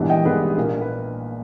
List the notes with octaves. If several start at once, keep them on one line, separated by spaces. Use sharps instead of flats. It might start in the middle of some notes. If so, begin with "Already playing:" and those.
Already playing: A#1 G#2 E3 G3 B3
D#5 G5
A#1 G#2 E3 G3 B3 G#4 B4
A#1 A#2 A#3
B4